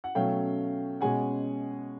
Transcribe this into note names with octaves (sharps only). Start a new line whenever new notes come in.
F#5
B2 F#3 A3 C#4 F5 G5
B2 G#3 C#4 F#5 G#5